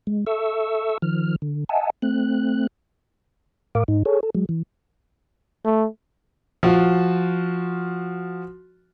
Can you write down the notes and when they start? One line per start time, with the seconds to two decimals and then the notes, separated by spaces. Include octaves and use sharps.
0.07 G#3
0.27 A4 E5 C#6 E6
1.02 D#3 F3 F6
1.42 D3
1.69 D#5 E5 F#5 G#5 A5
2.02 A3 C4 F#6
3.75 A2 A#4 F5 D6
3.88 G#2 D#4
4.05 G#4 A4 C#5
4.23 A4
4.35 F#3 G#3
4.49 E3
5.65 A3
6.63 F3 F4 F#4